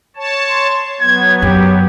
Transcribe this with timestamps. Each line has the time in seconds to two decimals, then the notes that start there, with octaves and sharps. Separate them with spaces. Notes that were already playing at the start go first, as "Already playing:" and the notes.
0.16 C#5 A5
0.50 C6
1.01 F#3 B3 G#6
1.42 F#2 G4